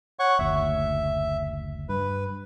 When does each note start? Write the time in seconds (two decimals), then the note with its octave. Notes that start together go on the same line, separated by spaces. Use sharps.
0.19 C#5 F#5 C#6
0.39 F#1 D2 E5
1.89 G2 B4